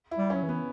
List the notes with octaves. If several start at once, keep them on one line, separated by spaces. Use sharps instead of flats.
E4
G3
C#4
F#3
E3
B3